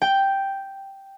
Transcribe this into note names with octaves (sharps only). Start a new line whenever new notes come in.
G5